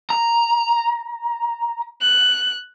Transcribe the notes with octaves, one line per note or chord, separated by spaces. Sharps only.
A#5
F#6